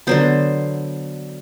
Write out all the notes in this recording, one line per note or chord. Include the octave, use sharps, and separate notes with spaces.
D3 F#3 B3 C5